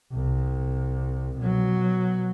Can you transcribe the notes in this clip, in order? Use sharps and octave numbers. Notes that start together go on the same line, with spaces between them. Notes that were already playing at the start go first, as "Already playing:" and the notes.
C2
B2 F#3